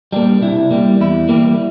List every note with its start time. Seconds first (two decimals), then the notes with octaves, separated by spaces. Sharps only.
0.13 G3 A#3 D4
0.42 C3 E4
0.71 G3 A#3
1.00 E2 E4
1.29 E3 G3 A#3